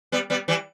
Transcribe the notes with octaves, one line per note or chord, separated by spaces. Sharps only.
G3 B3
G3 B3
E3 G3